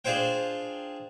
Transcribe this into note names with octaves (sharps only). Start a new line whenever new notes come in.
D4 F4 G#4 C5 G5